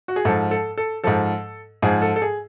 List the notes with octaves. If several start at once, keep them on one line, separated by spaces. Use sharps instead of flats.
F#4
G#4
G#2 F3 A4
A4
A4
G#2 F3 A4
G#2 F3 G#4
A4
A4
G#4